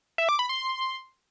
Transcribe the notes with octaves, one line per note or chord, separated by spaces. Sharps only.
E5
D6
B5
C6